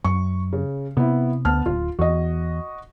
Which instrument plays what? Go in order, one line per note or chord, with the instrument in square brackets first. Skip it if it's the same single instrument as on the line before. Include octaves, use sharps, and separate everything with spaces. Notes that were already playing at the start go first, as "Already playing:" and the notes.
[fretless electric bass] F#2 [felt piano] C#6
[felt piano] C#3
[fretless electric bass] C3 [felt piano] B3 E4
[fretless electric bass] D2 [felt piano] B3 A5 F6
[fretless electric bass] D1 [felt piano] F4
[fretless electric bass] E2 [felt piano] F#4 D#5